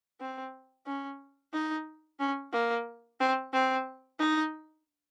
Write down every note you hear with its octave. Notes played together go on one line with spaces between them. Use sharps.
C4
C#4
D#4
C#4
A#3
C4
C4
D#4